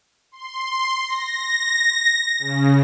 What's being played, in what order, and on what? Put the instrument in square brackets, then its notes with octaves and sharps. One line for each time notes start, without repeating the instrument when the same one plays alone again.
[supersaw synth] C6
A#6
C#3